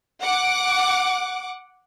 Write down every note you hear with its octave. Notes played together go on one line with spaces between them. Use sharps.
F#5 D6